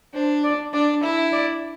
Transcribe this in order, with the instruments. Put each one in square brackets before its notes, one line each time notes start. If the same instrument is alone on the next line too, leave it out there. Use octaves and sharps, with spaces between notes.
[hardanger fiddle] D4 [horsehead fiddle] C5
[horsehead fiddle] D5
[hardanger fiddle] D4 [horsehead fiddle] D5
[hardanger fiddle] E4 [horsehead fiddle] E5
[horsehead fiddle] D5